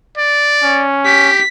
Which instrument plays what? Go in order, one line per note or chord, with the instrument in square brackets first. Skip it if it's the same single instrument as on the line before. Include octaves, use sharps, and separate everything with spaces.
[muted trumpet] D5
[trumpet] C#4
[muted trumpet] G4 [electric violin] B6